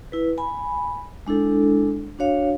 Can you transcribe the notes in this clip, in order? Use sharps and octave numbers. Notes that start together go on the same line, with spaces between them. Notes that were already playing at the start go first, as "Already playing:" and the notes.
E4 B4
G#5 B5
G#3 D4 E4 A4
D4 F#4 C#5 F5